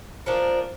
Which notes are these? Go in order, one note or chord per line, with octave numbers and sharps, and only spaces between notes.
F3 A#3 D4